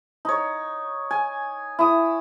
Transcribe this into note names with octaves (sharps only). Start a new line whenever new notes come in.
D#4 C#5
G#5
E4 D#6